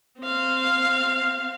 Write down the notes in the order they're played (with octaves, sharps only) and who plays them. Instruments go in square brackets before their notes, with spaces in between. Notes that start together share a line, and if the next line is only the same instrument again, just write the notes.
[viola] C4 F5